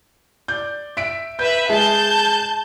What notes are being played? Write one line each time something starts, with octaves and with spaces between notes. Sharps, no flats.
D5 G6
E5 B6 D7
B4 E5 G6
G#3 G#4 A5 G6